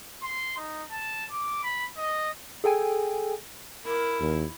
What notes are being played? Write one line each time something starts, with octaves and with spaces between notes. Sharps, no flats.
C6
D#4
A5
D6
B5
D#5
G#4 A4 G5 G#5
E4 A#4
D#2